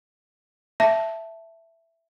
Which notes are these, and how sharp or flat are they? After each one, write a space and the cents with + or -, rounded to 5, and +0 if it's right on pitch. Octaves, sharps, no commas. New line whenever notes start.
E5 +5 A5 +0